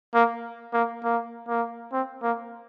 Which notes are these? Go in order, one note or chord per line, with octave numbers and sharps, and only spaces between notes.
A#3
A#3
A#3
A#3
C4
A#3